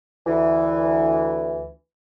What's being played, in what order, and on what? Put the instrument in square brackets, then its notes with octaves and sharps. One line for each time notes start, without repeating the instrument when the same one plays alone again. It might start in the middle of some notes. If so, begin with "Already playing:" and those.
[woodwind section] D2 E3